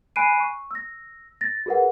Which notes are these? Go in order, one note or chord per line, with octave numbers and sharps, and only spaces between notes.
G#5 B5 F#6 C7 D7 D#7
C#6
E6 A#6
A6 A#6
F#4 G#4 A#4 B4 F#5